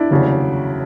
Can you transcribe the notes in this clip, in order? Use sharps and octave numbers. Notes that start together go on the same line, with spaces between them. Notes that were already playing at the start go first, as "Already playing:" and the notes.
Already playing: D4 E4
F1 D#2 C#3 F#3